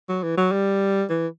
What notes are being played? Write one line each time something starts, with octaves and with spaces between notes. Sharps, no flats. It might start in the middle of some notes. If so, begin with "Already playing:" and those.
F#3
E3
F#3
G3
E3